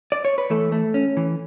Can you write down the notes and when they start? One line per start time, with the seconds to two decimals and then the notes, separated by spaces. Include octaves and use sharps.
0.12 D5
0.25 C#5
0.38 B4
0.50 E3 A3 A4
0.72 A3
0.94 C#4
1.17 E3